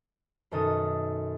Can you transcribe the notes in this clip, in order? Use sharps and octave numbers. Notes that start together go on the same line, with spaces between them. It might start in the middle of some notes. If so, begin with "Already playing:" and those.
F#2 B2 D#3 A4 D#6